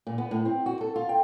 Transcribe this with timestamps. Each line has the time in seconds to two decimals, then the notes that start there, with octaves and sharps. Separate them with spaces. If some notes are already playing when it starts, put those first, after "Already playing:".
0.07 A#2
0.18 B3
0.31 A2
0.45 C4
0.66 F#4
0.81 A4
0.96 F4
1.09 G5